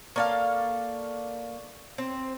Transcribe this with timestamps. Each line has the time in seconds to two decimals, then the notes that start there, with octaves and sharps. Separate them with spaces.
0.16 A#3 A4 D5 F5 C#6
1.98 C4